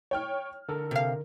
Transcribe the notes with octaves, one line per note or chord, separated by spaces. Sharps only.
C#5 G5 F6
D3 A4 A#4
C3 F5